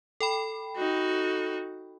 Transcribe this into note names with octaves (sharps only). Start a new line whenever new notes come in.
A4 G5 B5
D#4 F#4